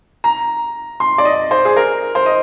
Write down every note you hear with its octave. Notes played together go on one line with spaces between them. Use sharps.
A#5
C6
D5
D#5
C5
G#4
A#4
C5
D#5